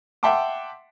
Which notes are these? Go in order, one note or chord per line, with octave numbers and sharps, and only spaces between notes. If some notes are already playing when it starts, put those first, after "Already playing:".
E5 F#5 G5 A5 C6 D6